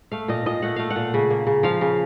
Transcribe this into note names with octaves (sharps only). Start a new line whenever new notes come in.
A3 F5
A#2 D#5
A#2 D#5
A3 F#5
A3 F5
F#5
A#2
C#3
A#3
C#3
F3 F5
C#3